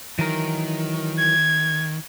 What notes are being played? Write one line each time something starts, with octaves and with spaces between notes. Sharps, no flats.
D#3 E3 F#3 A#4
G#6